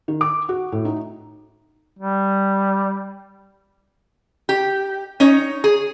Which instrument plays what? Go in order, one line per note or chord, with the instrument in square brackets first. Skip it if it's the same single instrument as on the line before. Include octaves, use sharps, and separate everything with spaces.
[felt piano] D#3
D6
F#4
A2
D#4
[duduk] G3
[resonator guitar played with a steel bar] G4
C#4 D#4 C#5
G#4